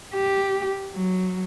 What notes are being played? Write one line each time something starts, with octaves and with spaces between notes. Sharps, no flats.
G4
F#3